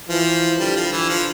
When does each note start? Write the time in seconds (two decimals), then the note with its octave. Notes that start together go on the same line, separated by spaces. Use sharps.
0.09 E3 F3
0.59 D3 G3
0.76 F3
0.92 E3
1.09 F3